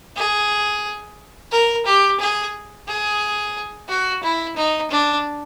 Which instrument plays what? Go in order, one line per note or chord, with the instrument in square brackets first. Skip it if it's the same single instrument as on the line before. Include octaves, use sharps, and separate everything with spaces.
[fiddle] G#4
A#4
G4
G#4
G#4
F#4
E4
D#4
D4